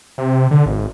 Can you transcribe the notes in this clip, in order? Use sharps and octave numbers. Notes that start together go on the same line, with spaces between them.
C3
D3
G#1